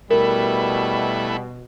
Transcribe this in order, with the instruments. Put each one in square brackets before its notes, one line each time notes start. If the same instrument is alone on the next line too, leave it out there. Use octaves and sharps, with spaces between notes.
[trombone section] B2 [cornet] G3 [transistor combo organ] A3 E4 B4 [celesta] A#4